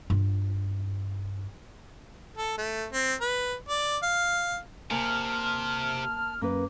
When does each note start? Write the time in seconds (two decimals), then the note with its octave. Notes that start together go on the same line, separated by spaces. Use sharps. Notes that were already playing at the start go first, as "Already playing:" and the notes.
0.10 G2 F4
2.37 A4
2.58 A3
2.93 C4
3.21 B4
3.69 D5
4.03 F5
4.91 C3 A#3 G#5 A5 F6
6.42 F#2 A#3 B4 D6